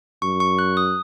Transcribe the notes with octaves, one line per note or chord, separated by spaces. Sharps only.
F#2 C#6
C#6
F#6
D#6